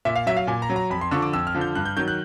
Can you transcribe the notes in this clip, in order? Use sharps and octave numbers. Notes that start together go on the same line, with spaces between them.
A#2 E5
F5
F#3 E5
F5
A#2 G#5
A#5
F#3
A#5
F2 B5
C6
D3 F3 C#6
D6
F2 E6
F6
D3 F3
G6
G2 F#6
G6
D#3 F#3 G6
F#6